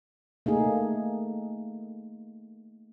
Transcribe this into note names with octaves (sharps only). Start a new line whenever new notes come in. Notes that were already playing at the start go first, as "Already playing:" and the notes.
A3 A#3 D#4 G#4